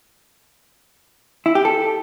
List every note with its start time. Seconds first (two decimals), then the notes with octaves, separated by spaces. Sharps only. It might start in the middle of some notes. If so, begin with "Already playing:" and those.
1.46 E4
1.55 G4
1.65 A4